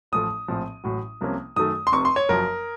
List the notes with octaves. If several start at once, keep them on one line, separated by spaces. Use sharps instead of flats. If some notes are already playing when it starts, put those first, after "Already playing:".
A1 A2 F3 A3 D#6
A#1 A2 F3 C4
A1 A2 F#3
C2 C3 F3 A#3 C#4
F#2 D#3 A3 D#6
C6
F1 F2 C3 C#6
C6
C#5
F#1 F#2 F3 A#4